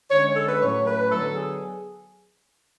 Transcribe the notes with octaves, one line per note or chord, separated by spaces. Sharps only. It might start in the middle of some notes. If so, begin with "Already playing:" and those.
D3 G#3 C#4 C#5
A4
B4
A2 F#3 A3 C#4 C#5
B4
D3 F#3 B3 A4
G#4